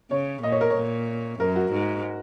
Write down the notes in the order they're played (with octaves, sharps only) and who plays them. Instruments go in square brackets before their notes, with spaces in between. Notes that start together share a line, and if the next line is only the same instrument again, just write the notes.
[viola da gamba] C#3 [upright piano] C#5
[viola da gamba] A#2 [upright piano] D#5
[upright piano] C#5
A#4
C#5
[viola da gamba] A#2
[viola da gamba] F#2 [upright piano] A#4
[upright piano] F#4
[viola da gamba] G#2